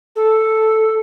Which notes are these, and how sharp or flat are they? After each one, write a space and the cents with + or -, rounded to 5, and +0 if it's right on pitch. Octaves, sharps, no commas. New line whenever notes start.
A4 +0